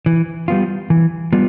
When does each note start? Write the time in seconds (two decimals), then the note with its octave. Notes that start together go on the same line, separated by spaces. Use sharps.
0.06 E3
0.48 G3 B3 F4
0.90 E3
1.33 G3 B3 F4